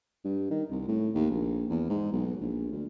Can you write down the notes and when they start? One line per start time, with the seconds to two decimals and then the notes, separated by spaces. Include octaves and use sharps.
0.24 G2
0.50 D#3
0.71 C2
0.88 A2
1.15 D#2
1.30 A#1
1.70 E2
1.89 G#2
2.12 B1
2.41 A#1
2.71 D2